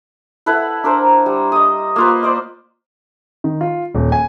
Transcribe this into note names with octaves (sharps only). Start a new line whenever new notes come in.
E4 A4 B4 F#5
D4 A#4 C5 A#5
G3
D#5 D#6
A#3 F4 B4
C5 D5 D#5
D#3
F4
D#1
G#5